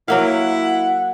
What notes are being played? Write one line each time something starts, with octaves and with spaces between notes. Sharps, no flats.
F#3 A#3 E4 F5 F#5